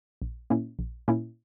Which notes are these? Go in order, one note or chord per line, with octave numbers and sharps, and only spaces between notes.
A#1
A#2 A#3 C#4 E4
A#1
A#2 A#3 C#4 E4